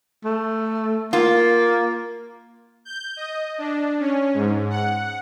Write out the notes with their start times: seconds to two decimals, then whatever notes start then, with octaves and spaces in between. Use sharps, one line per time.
0.25 A3
1.13 A#3 F4
2.85 G6
3.17 D#5
3.58 D4
3.99 C#4
4.34 G#2
4.70 F#5